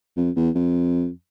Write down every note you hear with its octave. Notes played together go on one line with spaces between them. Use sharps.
F2
E2
F2